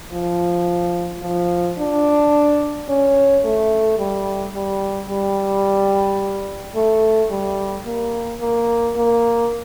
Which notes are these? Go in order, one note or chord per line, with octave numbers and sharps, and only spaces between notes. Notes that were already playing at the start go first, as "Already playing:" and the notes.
F3
F3
D4
C#4
A3
G3
G3
G3
A3
G3
A#3
A#3
A#3